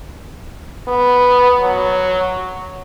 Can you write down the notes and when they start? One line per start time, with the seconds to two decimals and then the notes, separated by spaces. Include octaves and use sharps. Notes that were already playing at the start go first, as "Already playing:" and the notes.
0.88 B3
1.60 F#3